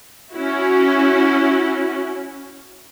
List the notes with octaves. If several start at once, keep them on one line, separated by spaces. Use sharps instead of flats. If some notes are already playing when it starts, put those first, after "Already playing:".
C#4 E4 F#4